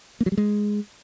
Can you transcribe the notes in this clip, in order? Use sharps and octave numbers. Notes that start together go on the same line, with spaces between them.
A#3
F#3
G3
G#3